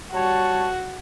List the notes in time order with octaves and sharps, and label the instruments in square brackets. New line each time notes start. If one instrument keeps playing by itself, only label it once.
[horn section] G3 C#5 A5 [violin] F#4